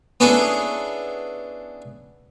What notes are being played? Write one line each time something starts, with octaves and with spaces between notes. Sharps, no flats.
B3 C#4 D4 E4 G#4 A4